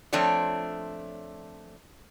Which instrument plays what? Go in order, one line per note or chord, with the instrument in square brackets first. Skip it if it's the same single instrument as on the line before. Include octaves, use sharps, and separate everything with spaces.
[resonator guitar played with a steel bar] F3 A3 C4 D4 C#5 D5